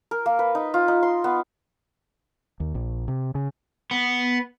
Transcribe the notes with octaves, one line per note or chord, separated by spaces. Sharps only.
A#4
A#3
B4
D#4
F4
D#4
C6
B3
D#2
A#1
C3
C#3
B3